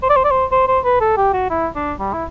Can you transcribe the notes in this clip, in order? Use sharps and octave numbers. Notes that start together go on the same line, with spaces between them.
C5
D5
C5
D5
C5
C5
C5
B4
A4
G4
F#4
E4
D4
G3
E4